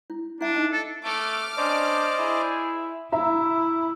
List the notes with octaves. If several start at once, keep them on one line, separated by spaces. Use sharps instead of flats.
E4
D4 E4 E5
D#4 D#5 A5
A4
A3 D6 F6
C#4 D4 C5 D5 D#5
E4 G#4
E4 E5 A#5